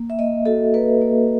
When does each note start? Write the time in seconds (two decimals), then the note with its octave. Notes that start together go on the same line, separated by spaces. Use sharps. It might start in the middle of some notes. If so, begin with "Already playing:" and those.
Already playing: A#3
0.10 E5
0.19 A#3 D#5
0.46 F#4 A4
0.74 A#3 B4
1.01 A#3